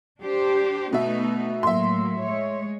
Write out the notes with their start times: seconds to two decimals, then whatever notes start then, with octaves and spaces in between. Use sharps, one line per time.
0.21 D4 G4 C5
0.93 B2 A3 B3 D#4 E5
1.63 A2 F#3 A#3 E5 C6
2.24 G#3 C#5